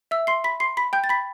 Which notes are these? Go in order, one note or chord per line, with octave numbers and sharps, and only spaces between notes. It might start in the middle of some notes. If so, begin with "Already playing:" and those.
E5 E6
C6 C7
B5 B6
C6 C7
B5 B6
G5 G6
A6
B5 B6